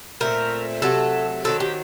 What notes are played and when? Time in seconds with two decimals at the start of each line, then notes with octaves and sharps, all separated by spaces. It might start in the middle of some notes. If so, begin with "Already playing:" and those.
0.20 A#2 A3 C4 A#4
0.82 C3 F#3 A3 A4
1.44 D#3 F#3 C4 A4
1.60 G4